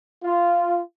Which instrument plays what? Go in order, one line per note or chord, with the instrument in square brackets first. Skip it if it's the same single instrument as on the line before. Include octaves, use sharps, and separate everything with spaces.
[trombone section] F4